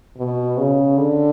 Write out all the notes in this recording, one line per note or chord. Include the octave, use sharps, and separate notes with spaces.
B2
C#3
D3